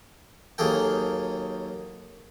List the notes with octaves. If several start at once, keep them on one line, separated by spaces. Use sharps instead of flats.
D#2 F#3 A#3 G#4 A4 G5